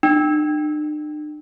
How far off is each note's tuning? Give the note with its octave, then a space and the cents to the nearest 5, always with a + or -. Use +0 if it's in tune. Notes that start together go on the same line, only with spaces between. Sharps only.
D4 +45